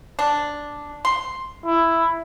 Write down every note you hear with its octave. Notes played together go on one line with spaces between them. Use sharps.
D4
C6
E4